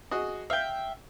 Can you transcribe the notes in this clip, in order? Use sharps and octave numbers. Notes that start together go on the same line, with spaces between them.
F#4 G#4 D#5
E5 F5 G5